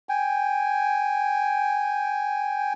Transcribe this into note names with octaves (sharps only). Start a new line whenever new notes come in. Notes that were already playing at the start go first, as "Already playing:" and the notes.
G5 G#5